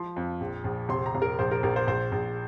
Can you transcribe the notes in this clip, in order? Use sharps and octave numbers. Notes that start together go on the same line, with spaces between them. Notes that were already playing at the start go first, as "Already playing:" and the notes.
Already playing: F3 C6
F2
A#1
A#1
F1 C6
A#5
F1
A#4
A#1 C5
A#4
A#1 A#4
C5
A#1 C5
A#1